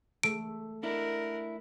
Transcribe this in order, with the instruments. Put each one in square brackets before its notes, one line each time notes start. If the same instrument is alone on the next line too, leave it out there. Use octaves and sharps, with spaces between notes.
[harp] A3 [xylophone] D7
[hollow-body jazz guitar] D4 E4 [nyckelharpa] A#4 F#5